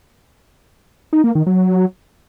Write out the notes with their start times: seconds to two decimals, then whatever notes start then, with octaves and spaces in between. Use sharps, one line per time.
1.13 D#4
1.24 A#3
1.35 D#3
1.47 F#3